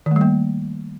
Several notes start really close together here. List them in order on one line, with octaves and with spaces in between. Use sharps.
D#3 A3 G3 A#3